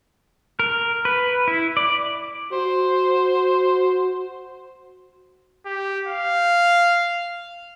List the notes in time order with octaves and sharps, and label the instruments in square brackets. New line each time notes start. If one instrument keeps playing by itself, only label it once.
[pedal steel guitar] A#4
B4
E4
D5
[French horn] F#4 [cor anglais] C5
[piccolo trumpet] G4
F5